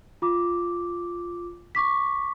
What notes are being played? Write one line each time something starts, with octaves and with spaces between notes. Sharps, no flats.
F4 D6
C#6 D6 B6